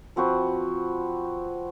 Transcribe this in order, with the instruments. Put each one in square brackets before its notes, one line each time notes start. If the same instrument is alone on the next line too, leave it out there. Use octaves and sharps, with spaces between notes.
[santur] F3 C4 F#4 B4